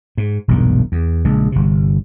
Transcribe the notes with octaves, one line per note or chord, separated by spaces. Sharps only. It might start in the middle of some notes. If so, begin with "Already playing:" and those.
G#2
E1 B1 G2 A#2
E2
A#1 C#3 G#3
G1 C3